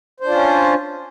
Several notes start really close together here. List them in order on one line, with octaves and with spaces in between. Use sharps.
C5 D4 F4 C#4